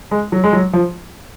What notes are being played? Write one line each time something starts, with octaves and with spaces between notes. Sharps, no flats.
G#3
F#3
G#3
F#3
F3